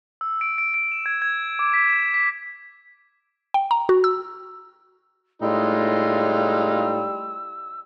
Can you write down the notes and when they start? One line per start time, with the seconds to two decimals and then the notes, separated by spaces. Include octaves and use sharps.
0.21 E6
0.41 D7
0.58 D7
0.74 D7
0.92 E7
1.06 G#6
1.22 G#6
1.59 D6
1.74 B6
1.88 E7
2.14 B6
3.54 G5
3.71 A#5
3.89 F#4
4.04 E6
5.42 A2 G3 G#3 D#4 F4 E6